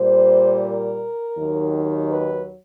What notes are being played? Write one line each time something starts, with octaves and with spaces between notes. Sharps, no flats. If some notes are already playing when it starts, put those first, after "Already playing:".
Already playing: A#2 G3 C5
A#4
D#2 D#3 F#3
B4